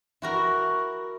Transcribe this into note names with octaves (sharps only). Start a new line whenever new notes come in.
E4 F#4 A#4